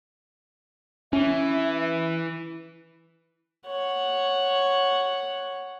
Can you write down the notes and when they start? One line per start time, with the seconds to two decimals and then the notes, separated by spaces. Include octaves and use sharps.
1.13 E3 C#4 E5
3.67 C#5 F#5